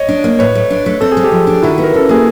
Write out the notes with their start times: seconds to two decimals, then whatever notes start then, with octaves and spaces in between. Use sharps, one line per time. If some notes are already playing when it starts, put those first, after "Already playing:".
Already playing: C#5 D#5
0.09 D4
0.24 A#3
0.39 A2 B4 C#5
0.55 A3
0.70 D4
0.86 A3
1.01 C4 A4
1.12 G#3 G#4
1.24 G4 A4
1.32 F3
1.47 D4
1.62 D#3 E4 F#4
1.78 B3
1.84 A#4
1.94 C#4 A4
2.09 A#3 G#4